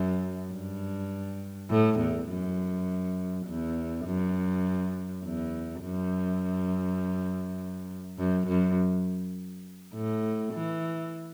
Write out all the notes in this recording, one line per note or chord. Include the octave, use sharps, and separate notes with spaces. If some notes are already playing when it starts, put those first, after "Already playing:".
Already playing: F#2
G2
A2
E2
F#2
E2
F#2
E2
F#2
F#2
F#2
A2
E3